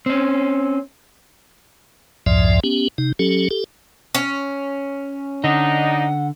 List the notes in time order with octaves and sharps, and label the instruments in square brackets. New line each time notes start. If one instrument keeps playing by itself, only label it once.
[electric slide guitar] C4 C#4
[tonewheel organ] C2 F2 G#2 F3 D5 E5
B3 C#4 G4
C3 D#4
F#3 C#4 G4 A4
G4 A4
[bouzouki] C#4
[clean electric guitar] D3 [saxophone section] D4 D#4 [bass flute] F#5